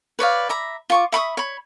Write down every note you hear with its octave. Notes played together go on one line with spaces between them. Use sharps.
B4 C#5 D5 F5
E5 A#5 B5
F4 C#6 D6
E5 B5 C#6 D#6
C#5 B5